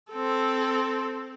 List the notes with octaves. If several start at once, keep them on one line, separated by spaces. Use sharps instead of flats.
C4 A4